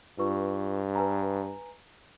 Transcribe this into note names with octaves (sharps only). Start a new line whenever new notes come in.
G2 F4 B4 C#6
B4 G#5 A#5